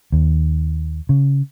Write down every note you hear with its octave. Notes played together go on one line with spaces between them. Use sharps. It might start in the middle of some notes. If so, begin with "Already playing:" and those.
D#2
C#3